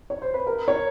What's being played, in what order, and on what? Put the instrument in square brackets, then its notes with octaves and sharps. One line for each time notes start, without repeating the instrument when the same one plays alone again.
[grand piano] C#5
C5
B4
A#4
C#5